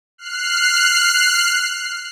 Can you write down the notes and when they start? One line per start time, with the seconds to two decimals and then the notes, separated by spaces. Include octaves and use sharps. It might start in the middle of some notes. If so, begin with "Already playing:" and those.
0.18 F6 F#6 C7